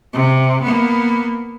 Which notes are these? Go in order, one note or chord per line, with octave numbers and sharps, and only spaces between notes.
C3
A#3 B3